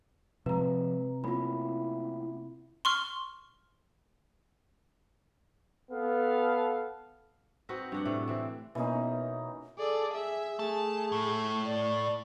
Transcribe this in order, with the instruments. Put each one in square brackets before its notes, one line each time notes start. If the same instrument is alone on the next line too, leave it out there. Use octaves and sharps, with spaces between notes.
[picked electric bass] C3 [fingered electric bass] F3 G#3 [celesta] B4 A#5
[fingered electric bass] A3 A#3 C#4 [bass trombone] E4 [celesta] F4 B5
[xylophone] C6 C#6 F6
[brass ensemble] B3 A4 F5
[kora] C4 D#4 F#4 B4
G2 D4 F#5
A2 C3 A3
E3 C4
[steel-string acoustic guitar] B2 A#3 [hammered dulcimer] E3 C#4 D#4
[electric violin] G#4 D5 [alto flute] A4
[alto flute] G#4 [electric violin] E5
[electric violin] A3 [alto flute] G#4 [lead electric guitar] A5
[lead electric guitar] A2
[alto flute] D5